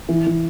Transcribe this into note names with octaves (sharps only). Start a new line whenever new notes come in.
E3
E3